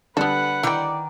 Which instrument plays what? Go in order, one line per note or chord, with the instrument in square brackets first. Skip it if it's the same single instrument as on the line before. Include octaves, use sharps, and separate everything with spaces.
[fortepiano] D3 G3 D4 [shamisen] B3 A4 [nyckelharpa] B4 F#5
[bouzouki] D#3 D5 [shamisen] E4 G5